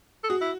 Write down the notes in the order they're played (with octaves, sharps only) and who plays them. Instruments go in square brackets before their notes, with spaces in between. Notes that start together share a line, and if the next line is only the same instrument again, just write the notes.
[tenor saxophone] A4
[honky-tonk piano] F#4 [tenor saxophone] G#4
[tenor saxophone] E4